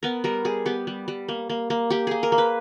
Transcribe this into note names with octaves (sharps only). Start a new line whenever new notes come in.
B3 A#4
G3 A#4
G3 G#4
B3 G4
G3
G3
A#3
A#3
A#3
A#3 G4
A#3 G#4
A#4
A#3
B4